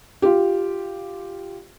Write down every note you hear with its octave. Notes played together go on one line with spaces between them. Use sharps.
F4 G4